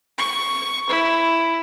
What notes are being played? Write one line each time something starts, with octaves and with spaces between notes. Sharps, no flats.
C#6
E4